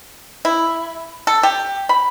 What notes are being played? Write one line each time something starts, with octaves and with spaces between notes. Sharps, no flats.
E4
A4
G4
B5